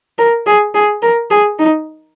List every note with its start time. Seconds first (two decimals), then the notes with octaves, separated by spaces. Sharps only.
0.18 A#4
0.46 G#4
0.74 G#4
1.02 A#4
1.31 G#4
1.59 D#4